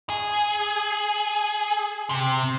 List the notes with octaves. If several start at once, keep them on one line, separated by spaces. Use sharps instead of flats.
G#4
C3